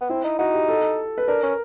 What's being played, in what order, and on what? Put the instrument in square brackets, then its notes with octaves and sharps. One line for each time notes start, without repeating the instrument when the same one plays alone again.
[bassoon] B3
[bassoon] C4 [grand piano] E4
[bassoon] D#4
[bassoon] D#4 [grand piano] F#4
[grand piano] G4
A4
B4
[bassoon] D4 [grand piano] A#4
[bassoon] C#4